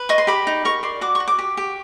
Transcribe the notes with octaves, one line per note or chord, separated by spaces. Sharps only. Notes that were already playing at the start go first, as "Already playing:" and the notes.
Already playing: B4
D#5 C#6
C6
G4 B5
D#4
A#4 C#6
D5 C6
F#4 D6
C#6
F#4
D6
G4
G4